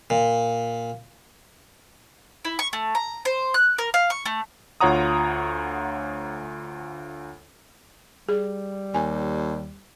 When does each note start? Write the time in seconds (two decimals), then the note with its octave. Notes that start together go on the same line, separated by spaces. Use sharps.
0.10 A#2
2.45 E4
2.59 C#6
2.73 A3
2.95 A#5
3.25 C5
3.54 F#6
3.78 A#4
3.94 F5
4.10 C#6
4.26 A3
4.81 D2 F4 C#5 F#5 A#5 D#6
8.29 G3 G#4
8.94 D#2 G#5